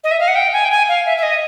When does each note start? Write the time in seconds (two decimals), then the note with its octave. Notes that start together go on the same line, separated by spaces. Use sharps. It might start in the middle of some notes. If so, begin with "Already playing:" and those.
0.04 D#5
0.11 E5
0.20 F5
0.28 F#5
0.36 G5
0.53 G#5
0.65 G5
0.71 G#5
0.88 F5
1.06 E5
1.18 E5
1.23 D#5